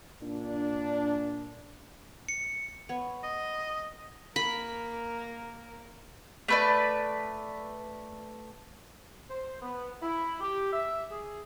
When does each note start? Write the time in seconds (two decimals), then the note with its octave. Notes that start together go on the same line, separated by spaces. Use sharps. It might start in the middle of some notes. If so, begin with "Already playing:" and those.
0.23 A#2 D4
2.29 C#7
2.89 B3 C#5
3.23 D#5
4.36 A#3 A#4 B5
6.48 A3 B4 D5
9.30 C5
9.62 B3
10.02 E4
10.41 G4
10.72 E5
11.10 G#4